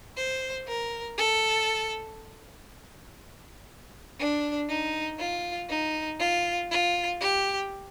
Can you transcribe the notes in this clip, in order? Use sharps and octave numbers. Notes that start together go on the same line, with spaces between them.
C5
A#4
A4
D4
D#4
F4
D#4
F4
F4
G4